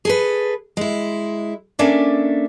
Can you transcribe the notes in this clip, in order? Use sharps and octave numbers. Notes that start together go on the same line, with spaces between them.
G#4 A4 B4
G#3 E4
A#3 C#4 D4 A4 E5